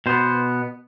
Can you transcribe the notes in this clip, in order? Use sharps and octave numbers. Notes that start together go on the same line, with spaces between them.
B2 B3 C5